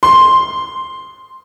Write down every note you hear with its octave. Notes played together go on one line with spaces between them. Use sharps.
C6